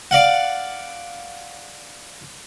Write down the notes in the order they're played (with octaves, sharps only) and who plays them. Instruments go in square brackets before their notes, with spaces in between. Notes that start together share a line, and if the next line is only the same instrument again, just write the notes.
[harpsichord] D5 F5 F#5